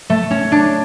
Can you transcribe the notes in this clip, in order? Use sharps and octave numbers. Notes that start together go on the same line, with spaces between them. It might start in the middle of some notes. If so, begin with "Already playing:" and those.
A3
C#4
D4